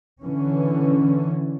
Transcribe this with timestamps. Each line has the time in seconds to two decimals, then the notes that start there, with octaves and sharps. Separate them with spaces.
0.22 D3 E3 C#4